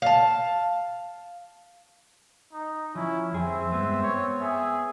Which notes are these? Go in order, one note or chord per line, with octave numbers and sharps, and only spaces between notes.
F5 A5
D#4
F3 C#4 E4
F2 C4 G#4 E5
G2 G#3 B3
B3 C#5
G#4 E5